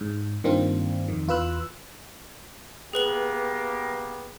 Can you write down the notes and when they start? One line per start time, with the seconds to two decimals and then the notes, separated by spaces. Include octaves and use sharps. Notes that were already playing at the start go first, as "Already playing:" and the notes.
0.01 G#2
0.44 G2 D#3 A#3 C4 D4 F4
1.08 F2 D#3
1.28 E2 F4 B4 E6 F#6
2.93 A#3 B3 G4 G#4 B4 F#7